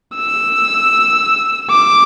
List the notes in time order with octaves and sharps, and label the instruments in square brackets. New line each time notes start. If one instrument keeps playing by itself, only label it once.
[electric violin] E6
D6